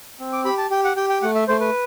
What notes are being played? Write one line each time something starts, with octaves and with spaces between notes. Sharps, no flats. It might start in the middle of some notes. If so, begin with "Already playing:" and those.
C4
D6
G4 B5
A5
G4 G5
F#5
G4 G5
G5
A3 F#5
E5
A3 C5
B4